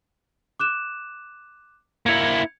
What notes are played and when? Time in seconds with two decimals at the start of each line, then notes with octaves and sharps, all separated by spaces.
0.60 D6 F#6 E7
2.06 A#3 E4 G#6 C#7 F7